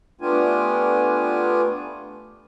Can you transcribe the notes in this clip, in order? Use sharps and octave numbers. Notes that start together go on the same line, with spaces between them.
A3 B3 D4 F4 G4 G#5